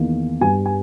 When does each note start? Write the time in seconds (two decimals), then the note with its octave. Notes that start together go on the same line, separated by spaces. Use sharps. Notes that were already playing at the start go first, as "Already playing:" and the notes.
Already playing: E2 D#3 A#3
0.41 G2 G3 B3 G#5
0.66 G#5